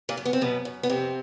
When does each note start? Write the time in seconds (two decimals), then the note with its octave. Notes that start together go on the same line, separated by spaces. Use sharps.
0.09 A#2 A#3
0.17 F#2
0.25 B3
0.33 C4
0.41 F#2 B2 B3
0.65 F#2
0.83 B3
0.90 F2 C3 C4